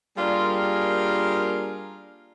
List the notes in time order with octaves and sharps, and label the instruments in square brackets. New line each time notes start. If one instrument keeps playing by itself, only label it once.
[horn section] G3 A#3 D4 F4 G#4 A#4